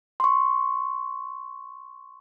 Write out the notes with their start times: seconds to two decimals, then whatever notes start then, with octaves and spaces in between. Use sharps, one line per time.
0.20 C6 C#6